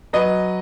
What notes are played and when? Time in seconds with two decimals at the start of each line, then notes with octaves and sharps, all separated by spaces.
0.13 F#3 B4 D#5